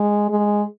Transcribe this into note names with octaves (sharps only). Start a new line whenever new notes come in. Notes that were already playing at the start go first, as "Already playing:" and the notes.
Already playing: G#3
G#3